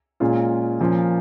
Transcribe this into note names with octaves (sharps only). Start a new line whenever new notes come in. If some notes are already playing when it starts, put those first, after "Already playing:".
A#2 G#3 C#4 F4
A#2 F3 A#3 C#4 F4